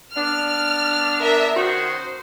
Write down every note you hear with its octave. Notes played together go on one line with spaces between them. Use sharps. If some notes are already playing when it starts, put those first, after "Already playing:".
B3 D4 F6
A#4 E5
D#3 C#4 F#4 C5